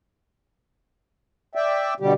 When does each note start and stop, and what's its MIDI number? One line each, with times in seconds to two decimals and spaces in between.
1.55 1.94 74
1.55 1.94 76
1.55 1.94 79
2.00 2.13 47
2.00 2.13 50
2.00 2.13 55
2.00 2.13 67